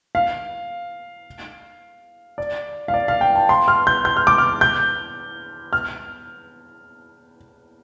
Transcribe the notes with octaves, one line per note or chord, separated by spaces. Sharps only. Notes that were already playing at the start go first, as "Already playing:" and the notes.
F5
D5
F5
D5
F5
G5
A5
C6
F6
G6
G6
F6
D6
F6
G6
F6